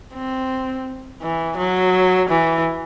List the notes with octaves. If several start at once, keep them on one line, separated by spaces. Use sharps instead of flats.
C4
E3
F#3
E3